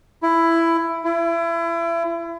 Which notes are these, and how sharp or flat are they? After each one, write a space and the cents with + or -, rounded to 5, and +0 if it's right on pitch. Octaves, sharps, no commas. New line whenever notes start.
E4 +10
E4 +30